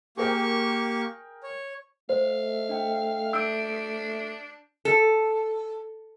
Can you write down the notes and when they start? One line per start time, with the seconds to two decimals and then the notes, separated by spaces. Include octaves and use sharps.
0.17 A#3 G4 G#4 A#4 G5 C#6
1.43 C#5
2.10 A3 C5 F5
2.69 D4 G5
3.33 D4 E6 G6 D7
4.85 A4